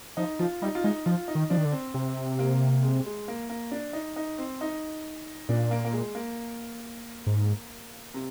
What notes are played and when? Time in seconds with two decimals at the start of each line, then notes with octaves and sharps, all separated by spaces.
0.17 F3 D#4
0.39 F3 F4
0.62 G3 D#4
0.75 F4
0.84 G#3 D#4
1.06 F3 F4
1.28 D#4
1.35 D#3
1.50 F3 D4
1.57 D#3
1.65 D3
1.72 C4
1.94 C3 C4
2.39 A#3
2.83 G#3
3.06 G#3
3.28 A#3
3.50 A#3
3.72 D4
3.93 D#4
4.16 D#4
4.38 C4
4.61 D#4
5.49 A#2 D4
5.71 A#3
5.85 A#3
5.93 G#3
6.15 A#3
7.27 G#2
8.14 C3